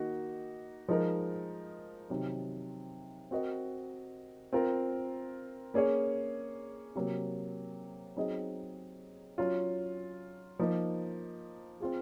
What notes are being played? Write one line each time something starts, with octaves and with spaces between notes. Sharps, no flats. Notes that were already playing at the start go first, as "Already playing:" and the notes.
Already playing: D#3 A#3 D#4 F#4
F3 G#3 D#4 A#4
C3 D#3 F#3
C4 F#4 A#4 D#5
C4 F4 A#4
A#3 C#4 G#4 C#5
C3 F#3 A#3
F#3 C4 D#4 G#4 D#5
F#3 C#4 F4
F3 A#3 D#4
C4 F4 G#4